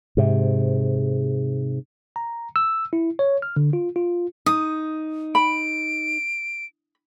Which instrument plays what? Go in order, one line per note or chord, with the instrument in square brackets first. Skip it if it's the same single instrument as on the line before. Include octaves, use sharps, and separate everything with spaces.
[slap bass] G#2 C3
[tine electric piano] A#5
E6
E4
C#5
F6
D3
F4
F4
[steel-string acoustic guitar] D#4 [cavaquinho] D#6
[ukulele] B5 [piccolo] D7